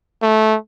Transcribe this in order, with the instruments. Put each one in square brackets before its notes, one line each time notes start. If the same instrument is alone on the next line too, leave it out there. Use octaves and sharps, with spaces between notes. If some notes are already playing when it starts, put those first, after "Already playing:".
[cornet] A3